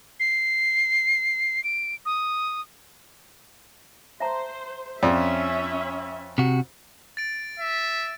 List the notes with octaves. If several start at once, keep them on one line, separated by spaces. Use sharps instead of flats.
C7
D7
D#6
C5 E5 A5 A#5
F2 C#4 F4 D5 E5 A5
C3 F#4
A6 D7
E5